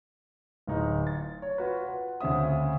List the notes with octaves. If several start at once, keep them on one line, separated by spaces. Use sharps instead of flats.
D1 D#4
A6
C#5
F4 F#4 B4
B4 F#5
D2 C#3 C4 E5 D#6